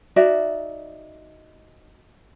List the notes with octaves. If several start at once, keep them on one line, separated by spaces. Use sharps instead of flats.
D#4 F#4 D5 E5